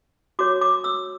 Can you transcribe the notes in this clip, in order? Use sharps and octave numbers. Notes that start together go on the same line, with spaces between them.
F#4 C#5 D6
D6
E6